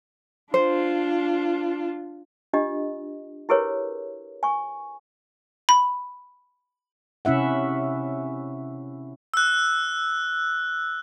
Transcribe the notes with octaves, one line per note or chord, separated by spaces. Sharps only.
D4 F4 C5
D4 F4 G4 D#5
E4 G4 G#4 A#4 B4 C#5
G#5 C#6
B5
C3 C#4 E4 E5 F#5
E6 F#6